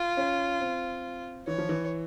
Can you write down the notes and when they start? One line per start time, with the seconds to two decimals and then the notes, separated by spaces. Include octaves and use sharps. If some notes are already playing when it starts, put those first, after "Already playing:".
Already playing: F4
0.17 C#4
0.61 C4
1.47 E3 C#5
1.58 F3
1.69 E3